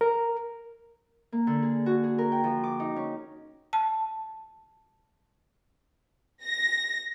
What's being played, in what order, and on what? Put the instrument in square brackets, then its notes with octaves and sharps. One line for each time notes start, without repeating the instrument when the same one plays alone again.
[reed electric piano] A#4
[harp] A#3
D3
G#4
F#4
G#4
A#4
G5
F3
D6
D#4
C#4
[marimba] A5
[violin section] A#6